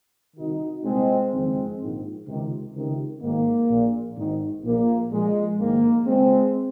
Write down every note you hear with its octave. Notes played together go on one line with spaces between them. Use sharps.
C2 C3 D#3 D#4 F#4
C2 A#2 G#3 C4
F#1 F2 D#3 G#3 C4
A#1 G#2 D#3
C#2 C3 D#3
C#2 C3 D#3
G#1 G#2 D#3 A#3
A#1 A#2
G#1 G#2 D#3
A#1 A#2 A#3
A#1 A#2 G#3
A#1 G#2 D#3 A#3
C#2 C#3 G#3 C4